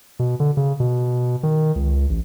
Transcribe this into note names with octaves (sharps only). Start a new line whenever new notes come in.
B2
D3
C#3
B2
D#3
C#2
A1